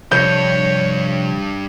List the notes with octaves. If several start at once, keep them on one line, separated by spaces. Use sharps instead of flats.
G2 C3 F3 C#5 G6